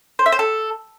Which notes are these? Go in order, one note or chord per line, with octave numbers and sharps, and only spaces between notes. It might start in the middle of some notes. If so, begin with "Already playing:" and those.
C5
E5
C5
A4